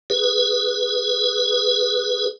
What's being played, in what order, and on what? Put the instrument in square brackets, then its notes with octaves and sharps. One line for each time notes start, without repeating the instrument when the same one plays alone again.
[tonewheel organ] G#4 B4